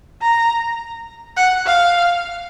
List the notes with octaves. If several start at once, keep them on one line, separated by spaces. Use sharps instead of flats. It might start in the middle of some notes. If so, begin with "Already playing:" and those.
A#5
F#5
F5